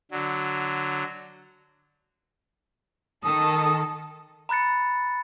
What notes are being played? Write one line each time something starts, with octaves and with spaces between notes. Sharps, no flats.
D3 F#3
D#3 A4 D#6
A#5 B5 F#6 A6 C#7